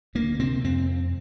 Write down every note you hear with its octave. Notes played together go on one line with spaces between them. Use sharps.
D2 A#3
C3 C4
F2 C4